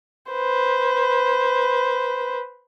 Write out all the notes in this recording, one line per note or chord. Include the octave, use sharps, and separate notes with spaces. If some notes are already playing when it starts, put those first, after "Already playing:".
B4 C5